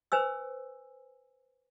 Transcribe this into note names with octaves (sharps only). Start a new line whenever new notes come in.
B4 C5 G#5 E6